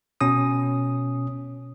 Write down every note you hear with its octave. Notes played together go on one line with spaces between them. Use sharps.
B2 C#4 D#6